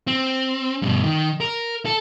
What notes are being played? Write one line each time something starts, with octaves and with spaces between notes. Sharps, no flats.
C4
G2 B2
D#3
A#4
A4